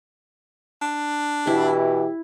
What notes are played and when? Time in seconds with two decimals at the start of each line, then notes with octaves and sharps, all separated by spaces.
0.82 D4
1.47 B2 E3 E4 G4